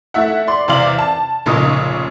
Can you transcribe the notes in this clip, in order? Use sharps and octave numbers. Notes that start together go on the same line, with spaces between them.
A3 E4 E5 F#5
D5 C6
E2 C3 D5 F5 F#7
A5
F1 A#2 C#3 C#4 D#4 D#6